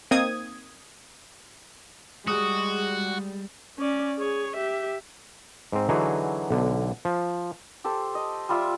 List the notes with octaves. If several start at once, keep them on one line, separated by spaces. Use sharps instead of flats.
A#3 C4 D#4 D#6 G#6
G3 G#3 F#4 D#6
C#4 D5
G#4 C#5
G4 E5
G#2 C4
D3 E3 F#3 D#4 F#4 G#4
B1 D3
F3
G4 A4 C5
D#5
G3 F4 E5